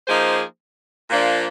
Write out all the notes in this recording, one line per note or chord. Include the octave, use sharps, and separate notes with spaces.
F3 A#3 D#4 G#4 C5
A#2 F3 A#3 D4